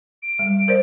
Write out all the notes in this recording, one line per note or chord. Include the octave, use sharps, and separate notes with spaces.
D7
G3
A#4 C5 D5